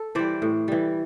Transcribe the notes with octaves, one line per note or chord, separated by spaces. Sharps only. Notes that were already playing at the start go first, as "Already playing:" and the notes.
Already playing: A4
E3 G3 C5 D5
A2
E3 G3